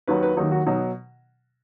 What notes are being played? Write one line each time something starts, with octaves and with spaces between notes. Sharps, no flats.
D#2 D#3 F#3 B4
B4
D#2 D#3 F#3 D#4
F#4
B2 F#3 D#4